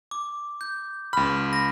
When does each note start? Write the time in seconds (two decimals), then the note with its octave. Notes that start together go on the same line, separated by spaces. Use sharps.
0.11 D6
0.61 G6
1.13 C#2 B5 F6
1.53 A#6